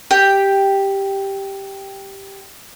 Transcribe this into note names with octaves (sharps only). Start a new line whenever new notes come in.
G4 G5